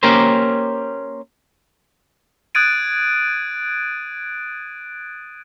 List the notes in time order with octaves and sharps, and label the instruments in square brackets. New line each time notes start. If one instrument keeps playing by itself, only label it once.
[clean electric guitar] A#3 C#4 G4 A#4 C5
[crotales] D#6 F#6 G#6 A6 D7 D#7